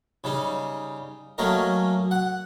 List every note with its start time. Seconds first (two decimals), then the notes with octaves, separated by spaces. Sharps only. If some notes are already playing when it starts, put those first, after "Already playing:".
0.24 C#3 G3 D#4
1.38 F#3 A3 A#3 C#4 A#4 D#5
2.11 F#5